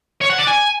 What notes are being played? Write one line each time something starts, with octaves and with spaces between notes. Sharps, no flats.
C#5
F#5
D5
G#5